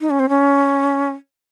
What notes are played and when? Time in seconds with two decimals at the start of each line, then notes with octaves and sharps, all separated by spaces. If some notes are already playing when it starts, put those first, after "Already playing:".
0.01 D#4
0.10 C#4
0.20 C4
0.29 C#4